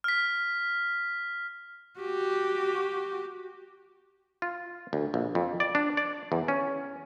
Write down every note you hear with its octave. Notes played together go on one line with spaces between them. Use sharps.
F6 B6
F#4 G4
F4
D2
A#1
F2
D5
D4
D5
E2
C#4